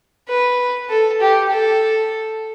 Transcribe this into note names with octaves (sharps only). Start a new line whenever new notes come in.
B4
A4
G4
A4